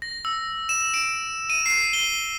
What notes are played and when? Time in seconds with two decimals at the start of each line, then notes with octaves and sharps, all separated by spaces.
0.02 A#6
0.25 E6
0.69 E7
0.94 D7
1.50 D#7
1.66 C7
1.93 G7